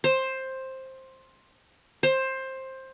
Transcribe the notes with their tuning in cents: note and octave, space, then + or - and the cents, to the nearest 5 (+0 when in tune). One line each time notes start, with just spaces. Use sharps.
C5 +10
C5 +15